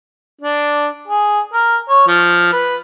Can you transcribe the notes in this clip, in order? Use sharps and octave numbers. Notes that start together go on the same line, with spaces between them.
D4
G#4
A#4
C#5
F3
B4